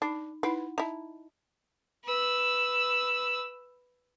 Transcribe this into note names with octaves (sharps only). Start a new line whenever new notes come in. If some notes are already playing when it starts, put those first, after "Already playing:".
D4 D#4
D#4 E4 B4 F#5
D#4 E4 A5
B4 E6